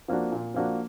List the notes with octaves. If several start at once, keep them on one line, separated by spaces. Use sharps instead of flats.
F3 A#3 D4 F#4
A#2
F3 A#3 D4 F#4